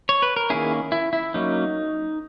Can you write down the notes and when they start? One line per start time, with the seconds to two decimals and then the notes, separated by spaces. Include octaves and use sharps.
0.09 C#5
0.22 B4
0.36 A#4
0.50 D#3 A#3 C#4 E4 G#4
0.92 E4
1.13 E4
1.34 F#3 A#3 C#4 D#4